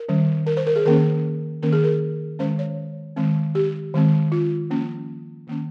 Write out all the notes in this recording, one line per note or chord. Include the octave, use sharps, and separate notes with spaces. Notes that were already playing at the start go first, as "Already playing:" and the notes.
Already playing: A#4
D#3 G3 C#4
A#4
C5
A#4
G#4
D#3 A#3 C#4 A#4
D#3 A#3 C#4 A#4
G#4
A#4
D#3 G#3 C#4 C5
C#5
D#3 G#3 C4
G4
D#3 G#3 C4
F4
F3 A#3 C#4
D#3 A#3 C#4